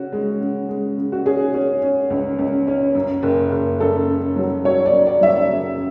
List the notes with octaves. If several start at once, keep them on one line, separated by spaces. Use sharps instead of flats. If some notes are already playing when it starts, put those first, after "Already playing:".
Already playing: C#3 C#4 F#4
G#3
C#3
G#3
C#3
F#4
C#4 G#4
C#4
C#4
C#2
C#2
C#4
F#2
F#1
F#1
F#2 A4
C#3
F#3
F#3 C#5
D5
F#2
D5
F#3 E5
D5
C#3